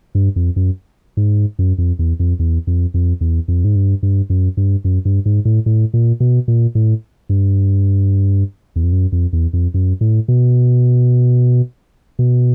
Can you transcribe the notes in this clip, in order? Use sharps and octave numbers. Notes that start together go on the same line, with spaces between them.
G2
F2
F#2
G#2
F#2
F2
E2
F2
E2
F2
F2
E2
F2
G#2
G2
G2
F#2
G2
F#2
G2
G#2
A2
A2
A#2
B2
A#2
A2
G2
E2
F2
F#2
F2
E2
F2
F#2
A2
B2
B2